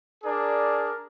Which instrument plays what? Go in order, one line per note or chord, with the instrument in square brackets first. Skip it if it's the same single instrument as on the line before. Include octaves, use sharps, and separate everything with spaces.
[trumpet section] D4 G#4 A#4 D5